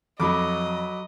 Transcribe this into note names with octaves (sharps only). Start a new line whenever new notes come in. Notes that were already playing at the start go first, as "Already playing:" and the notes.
F2 F#3 D#5 B5 D6